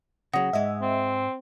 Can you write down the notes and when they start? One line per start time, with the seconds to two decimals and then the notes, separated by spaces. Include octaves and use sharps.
0.33 C#3 F#3 F#5 D#6 A#6
0.53 G#2 G#3 D#5 E5
0.82 C4